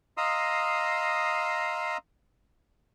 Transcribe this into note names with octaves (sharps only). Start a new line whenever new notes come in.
D#5 F5 A#5 C6 D#6 E6